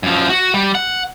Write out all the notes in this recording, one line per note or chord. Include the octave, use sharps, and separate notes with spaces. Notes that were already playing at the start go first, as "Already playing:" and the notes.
F#2 F3
F#4
G3
F#5